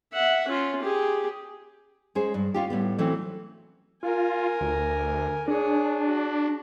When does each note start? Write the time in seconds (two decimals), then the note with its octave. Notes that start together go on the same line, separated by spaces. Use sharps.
0.14 E5 F#5
0.48 C#4 F4
0.82 G4 G#4
2.15 G#3 C#4 G#4 C5
2.34 G2
2.54 C#4 F4 G4
2.70 A2 G3 B3
2.98 E3 F#3 A3 C4 C#4
4.03 F4 A#4 G#5
4.61 D2
5.48 D4 G#4 C#5
6.05 F#4